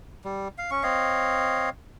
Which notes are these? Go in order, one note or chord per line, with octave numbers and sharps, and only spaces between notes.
G3
F5
C#4 C#6
C4 C#5 D#5 F5